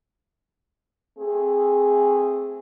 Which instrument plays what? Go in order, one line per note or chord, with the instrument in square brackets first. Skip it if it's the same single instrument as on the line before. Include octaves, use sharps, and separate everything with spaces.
[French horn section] A3 C4 G#4